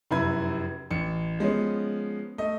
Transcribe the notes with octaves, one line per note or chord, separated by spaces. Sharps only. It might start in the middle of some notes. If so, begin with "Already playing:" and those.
F1 F#2 E4 B4 B5 G#6
A1 C#7
F3 G#3 B3 C#4
A3 D#5